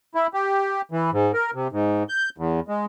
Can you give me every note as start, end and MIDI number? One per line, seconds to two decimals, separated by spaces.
0.15 0.27 64
0.34 0.82 67
0.92 1.10 52
1.12 1.32 44
1.34 1.51 70
1.54 1.68 48
1.72 2.03 44
2.09 2.29 91
2.38 2.60 40
2.68 2.85 56